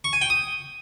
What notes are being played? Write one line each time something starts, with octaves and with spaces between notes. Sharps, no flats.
C#6
G#5
G5
D#6